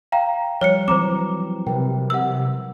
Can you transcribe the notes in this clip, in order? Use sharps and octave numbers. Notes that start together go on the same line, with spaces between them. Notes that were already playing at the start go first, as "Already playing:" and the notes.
F5 G5 A#5
F3 G3 C#5 F6 C#7
E3 F#3 C4 C5 A#5 D6 E7
C3 A#4 B4 G5
F#5 E6